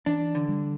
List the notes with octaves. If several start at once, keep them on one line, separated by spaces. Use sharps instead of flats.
E3 D4
D3
G3